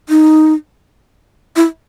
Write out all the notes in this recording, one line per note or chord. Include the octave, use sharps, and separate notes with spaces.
D#4
E4